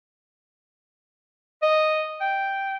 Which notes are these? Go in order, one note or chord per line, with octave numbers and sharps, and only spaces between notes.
D#5
G5